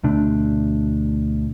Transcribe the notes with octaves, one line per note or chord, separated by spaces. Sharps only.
D2 B2 A3 D4